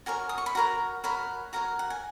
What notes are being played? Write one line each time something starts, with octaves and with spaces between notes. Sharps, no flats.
F#4 A#4 C#5 G#5
D#6
C#6
B5
F#4 A#4 C#5 A#5
F#4 A#4 C#5 B5
F#4 A#4 C#5 A#5
F#5
G#5